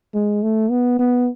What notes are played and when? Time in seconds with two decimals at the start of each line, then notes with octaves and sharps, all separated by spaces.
0.14 G#3
0.43 A3
0.70 B3
0.99 B3